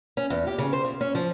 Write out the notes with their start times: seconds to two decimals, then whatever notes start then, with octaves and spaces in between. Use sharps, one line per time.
0.17 C#4
0.30 E2
0.47 G4
0.58 C#3
0.73 C5
0.84 C#3
1.01 C#4
1.15 F3